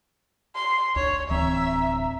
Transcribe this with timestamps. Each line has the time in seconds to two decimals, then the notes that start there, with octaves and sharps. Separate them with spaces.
0.56 C6
0.96 D2 C#5
1.30 D1 E3 C4 E5 A#5